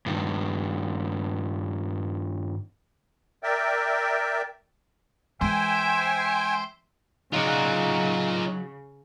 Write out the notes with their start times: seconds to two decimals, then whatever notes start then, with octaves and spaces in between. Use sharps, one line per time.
0.06 G2 D#3
3.43 A#4 D5 E5 G5
5.41 E3 G#3 C5 E5 G5 G#5
7.33 C#3 F#3 D#4 F4 F#4 D5